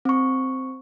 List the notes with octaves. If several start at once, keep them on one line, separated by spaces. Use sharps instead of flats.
C4 C#6